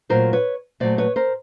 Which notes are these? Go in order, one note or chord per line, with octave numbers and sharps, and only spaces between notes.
A#2 F#3 A3 A#4 C5
B4 C#5
A#2 F#3 A3 C5 D5
B4 C#5
A#4 C5